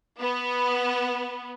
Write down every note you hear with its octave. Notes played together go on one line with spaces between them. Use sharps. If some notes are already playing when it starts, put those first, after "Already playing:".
B3